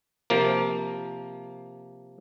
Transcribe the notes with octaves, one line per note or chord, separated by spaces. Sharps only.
C3 F3 A#3